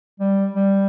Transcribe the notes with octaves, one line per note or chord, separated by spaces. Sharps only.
G3
G3